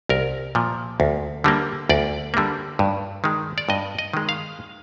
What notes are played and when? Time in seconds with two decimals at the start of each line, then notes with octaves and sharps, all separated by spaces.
0.09 C2 A#4
0.55 A#2 F3
1.00 D2
1.44 D3 G3 A#3
1.89 D2 D5
2.34 D3 G3 A#3
2.79 G2
3.24 D#3 G#3
3.58 D5
3.69 G2 D#5
3.99 D#5
4.13 D#3 G#3
4.29 F5